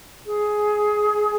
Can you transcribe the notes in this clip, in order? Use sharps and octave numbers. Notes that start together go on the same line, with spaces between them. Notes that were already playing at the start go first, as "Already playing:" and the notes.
G#4